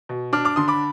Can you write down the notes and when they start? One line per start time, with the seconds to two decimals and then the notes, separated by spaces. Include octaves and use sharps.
0.09 B2
0.33 D4 D6 F6
0.45 D6 F6
0.56 D3 C6 D#6
0.68 B5 D6